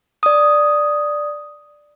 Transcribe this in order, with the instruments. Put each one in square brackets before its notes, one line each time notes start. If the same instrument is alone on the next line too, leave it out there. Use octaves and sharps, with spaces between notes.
[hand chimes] D5 D#6